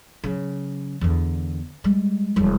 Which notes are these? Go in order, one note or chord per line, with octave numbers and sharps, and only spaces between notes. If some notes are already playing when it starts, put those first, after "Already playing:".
C#3 F#3
E2 D3
G3 G#3
E1 G3